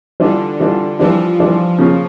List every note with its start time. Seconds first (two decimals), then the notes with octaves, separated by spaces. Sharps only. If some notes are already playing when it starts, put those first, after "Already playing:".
0.20 D3 E3 G3 D4 F4
0.60 E3 G3 D4 F4
0.99 E3 F3 G3 D4 F4
1.39 E3 G3 D4 F4
1.79 C#3 F3 A#3 C#4 F4